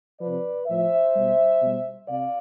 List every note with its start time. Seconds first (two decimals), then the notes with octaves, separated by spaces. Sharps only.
0.20 C3 F3 B4 D5
0.67 A2 F3 C5 E5
1.14 B2 G3
1.61 B2 G3
2.08 C3 D5 F5